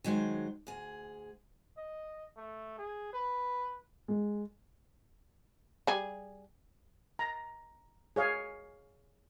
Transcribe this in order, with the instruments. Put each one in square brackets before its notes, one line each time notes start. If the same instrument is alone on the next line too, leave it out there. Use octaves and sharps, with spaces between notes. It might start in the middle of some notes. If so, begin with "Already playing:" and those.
[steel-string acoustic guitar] D#3 F#3 G#3 C5
D2 G#4
[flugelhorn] D#5
A3
G#4
B4
[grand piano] G#3
[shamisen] G3 G#4
[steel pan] A#5
G#4 C#5 F5